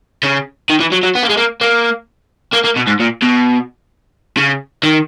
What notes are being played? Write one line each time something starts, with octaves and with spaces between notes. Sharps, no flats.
C#3
D#3
E3
F#3
F#3
B3
A#3
G#3
A#3
A#3
A#3
A#3
B2
G#2
A#2
B2
C#3
D#3